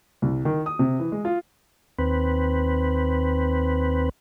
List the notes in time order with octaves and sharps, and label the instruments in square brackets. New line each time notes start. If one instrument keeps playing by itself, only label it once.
[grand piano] C2
D#3
D#6
C3
E3
G#3
F4
[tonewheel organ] D#2 C4 B4